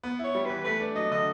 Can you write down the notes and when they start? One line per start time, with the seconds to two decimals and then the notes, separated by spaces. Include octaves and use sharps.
0.03 B3
0.19 E4
0.24 C#5
0.35 G3
0.45 E3 B4
0.64 A3 B4
0.80 D4
0.96 F#3 D#5
1.11 D3 D#5